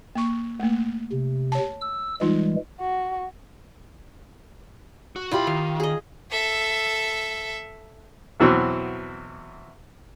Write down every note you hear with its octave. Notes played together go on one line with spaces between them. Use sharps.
A#3 C#6
A3 A#3
C3
C#5 A5
E6
E3 G3 G#3 D#4 F4
F#4
F#4
B1 E4 F4 G4 B5
D#3 F5
G#4 D#5
A4 E5
E2 B2 E3 F#3 C4